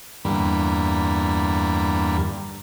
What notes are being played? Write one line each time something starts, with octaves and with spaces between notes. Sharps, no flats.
E2 G2 D3 G3 A#3 B5